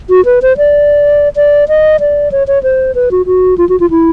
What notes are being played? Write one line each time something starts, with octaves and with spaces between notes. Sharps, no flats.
F#4
B4
C5
D5
D5
D#5
D5
C#5
C#5
C5
B4
F#4
F#4
F4
F#4
F4
E4